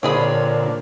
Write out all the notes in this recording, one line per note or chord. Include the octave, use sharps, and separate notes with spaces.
A#2 D3 C4 G#4 C#5 B5